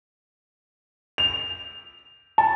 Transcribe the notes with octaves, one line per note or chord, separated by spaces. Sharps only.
F7
A5